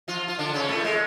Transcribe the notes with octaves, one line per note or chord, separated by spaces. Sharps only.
F3 F4
F4
D3 D4
C#3 C#4
A2 A3
G#3